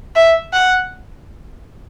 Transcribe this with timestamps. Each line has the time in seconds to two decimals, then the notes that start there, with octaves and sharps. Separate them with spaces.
0.16 E5
0.53 F#5